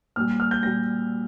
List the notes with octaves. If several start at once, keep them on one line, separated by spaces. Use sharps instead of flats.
A#2 G3 F6
F6
G6
A#2 G3 A#6